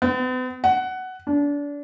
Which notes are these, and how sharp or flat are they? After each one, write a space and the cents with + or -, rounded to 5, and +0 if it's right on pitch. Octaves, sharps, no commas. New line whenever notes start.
B3 +45
F#5 +10
D4 -30